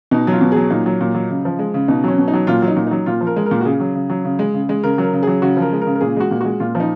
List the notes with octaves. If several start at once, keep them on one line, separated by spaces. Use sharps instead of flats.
B2 D#4
F#3 F4
B2
F#3 G#4
A#2 D#4
F#3
A#2
F#3
C#3
F3
G#3
C#3
B2 D#4
F#3 C#4
B2
D#4
F#3
A#2 F4
F#3
D#4
A#2
F#3 D#4
A#2 F4
F3
A#4
G#3
A#4
A#2
F#4
C#3 G#4
F#3
C#3
F#3
C#3
G#3
C#3
G#3
C#3 A#4
F#3 A#4
C#3
F#3 G#4
C#3 F#4
F3
A#4
G#3
A#4
C#3
A#4
A#2 G#4
G#3 F#4
A#2
G#3 F#4
A#2 F4
F3
D#4